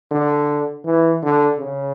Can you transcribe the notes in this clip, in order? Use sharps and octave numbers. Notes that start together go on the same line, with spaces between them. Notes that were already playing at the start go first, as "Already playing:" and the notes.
D3
E3
D3
C#3